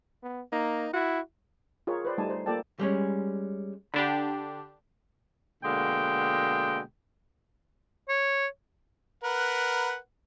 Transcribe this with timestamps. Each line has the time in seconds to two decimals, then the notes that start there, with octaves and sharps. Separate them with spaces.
0.23 B3
0.52 A#3 D#4
0.93 E4 F#4
1.87 F4 G#4 A#4 C#5
2.05 B4 C5 D5
2.18 G3 A3 D#4 D5 G#5 A5
2.30 C5
2.46 A#3 F4 A4 D5 G5 A5
2.79 G3 G#3 C#4
3.94 D3 D4 G4 B5
5.64 B2 D3 G#3 A#3 G5
8.09 C#5
9.24 A#4 B4 F#5